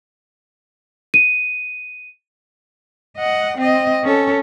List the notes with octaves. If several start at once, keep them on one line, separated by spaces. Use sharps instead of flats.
D#7
D#5 F#5
C4 D#5
C#4 A4